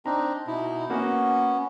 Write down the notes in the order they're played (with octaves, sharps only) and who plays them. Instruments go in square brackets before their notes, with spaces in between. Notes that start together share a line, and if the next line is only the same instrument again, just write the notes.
[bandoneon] C4 D4 D#4 [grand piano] A#5
[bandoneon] B2 D#4 E4
[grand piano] A#3 F#4 [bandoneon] B3 C#4